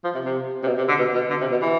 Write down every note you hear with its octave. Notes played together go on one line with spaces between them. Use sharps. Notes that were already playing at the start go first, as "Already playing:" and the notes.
F3
C3
C3
C3
B2
C3
D3
B2
B2
D3
C3
B2
E3